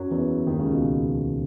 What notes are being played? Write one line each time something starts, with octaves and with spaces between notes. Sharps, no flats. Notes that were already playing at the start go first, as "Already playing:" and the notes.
Already playing: F#2 F#3
E2 E3
D#2 D#3
C#2 C#3
B2